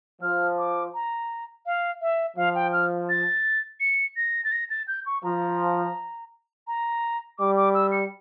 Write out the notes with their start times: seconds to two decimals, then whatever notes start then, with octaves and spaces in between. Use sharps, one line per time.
0.22 F3 F6
0.58 D6
0.94 A#5
1.66 F5
2.02 E5
2.37 F3 F5
2.55 G5
2.73 F6
3.09 A6
3.80 C#7
4.16 A#6
4.44 A6
4.52 A#6
4.70 A6
4.88 G6
5.06 C#6
5.24 F3 A#5
6.67 A#5
7.39 G3 D6
7.57 D6
7.74 E6
7.92 C#7